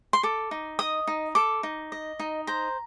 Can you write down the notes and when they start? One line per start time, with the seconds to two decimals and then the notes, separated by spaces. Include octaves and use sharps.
0.13 C6
0.23 A4 D6
0.51 D#4
0.79 D#5 D#6
1.07 D#4
1.35 A4 D6
1.63 D#4
1.92 D#5
2.19 D#4
2.47 C5 A#5